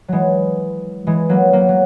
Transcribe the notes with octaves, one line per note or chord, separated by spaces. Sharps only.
E3 F#3 G#3
E3 G#3
F#3 A#3
F#3 A#3
F#3